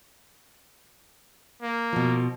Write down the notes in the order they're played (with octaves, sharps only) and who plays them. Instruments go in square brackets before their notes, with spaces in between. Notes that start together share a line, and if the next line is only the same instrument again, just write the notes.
[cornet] A#3
[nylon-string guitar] B2 F3